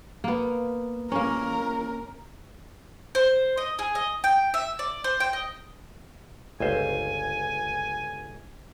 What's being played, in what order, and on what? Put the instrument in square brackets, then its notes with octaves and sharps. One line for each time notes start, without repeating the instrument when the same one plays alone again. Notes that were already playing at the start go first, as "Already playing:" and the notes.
[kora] A#3 B3
[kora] A#3 C#4 [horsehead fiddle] A#4
[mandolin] C5
D#5
G#4
D#5
G5
E5
D5
C5
G5
D#5
[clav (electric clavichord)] G1 C#2 C5 [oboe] G#5